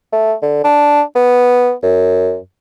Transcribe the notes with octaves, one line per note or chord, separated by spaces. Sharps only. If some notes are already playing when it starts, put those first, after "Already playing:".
A3
D3
D4
B3
F#2